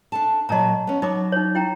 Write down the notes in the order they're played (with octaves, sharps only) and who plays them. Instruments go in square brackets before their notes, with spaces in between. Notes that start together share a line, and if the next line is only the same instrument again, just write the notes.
[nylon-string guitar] D4 A4 A5
[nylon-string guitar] A#2 F#3 [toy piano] D#5 A5 A#5
[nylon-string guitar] B3 C#4
[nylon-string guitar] F#3 [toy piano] D#4 B5 D6
[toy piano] D#4 C#5
E4 G5 A#5